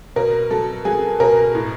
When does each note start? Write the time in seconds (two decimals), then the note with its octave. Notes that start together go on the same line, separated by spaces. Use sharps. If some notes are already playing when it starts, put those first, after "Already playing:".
0.16 B2 A#4
0.51 F#3 A4
0.85 F#3 G#4
1.20 B2 A#4
1.55 A2